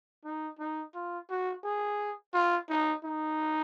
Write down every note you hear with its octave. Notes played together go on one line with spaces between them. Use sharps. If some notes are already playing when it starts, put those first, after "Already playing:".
D#4
D#4
F4
F#4
G#4
F4
D#4
D#4